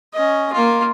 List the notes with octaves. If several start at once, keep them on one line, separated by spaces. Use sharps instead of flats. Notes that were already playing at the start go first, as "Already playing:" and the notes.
C#4 D#5
A#3 F4